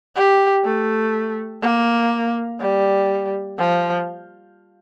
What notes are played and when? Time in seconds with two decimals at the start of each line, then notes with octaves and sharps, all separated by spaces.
0.16 G4
0.65 A3
1.62 A#3
2.60 G3
3.59 F3